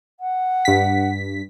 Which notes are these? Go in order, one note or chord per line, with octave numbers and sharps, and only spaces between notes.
F#5
G2 B6